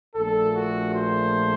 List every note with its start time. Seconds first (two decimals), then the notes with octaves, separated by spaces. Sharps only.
0.16 A#1 A#2 A3 A4
0.56 F#4
0.96 C5